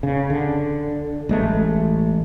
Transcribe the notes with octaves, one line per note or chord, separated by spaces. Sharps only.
C#3
D3
A1 G#3 A3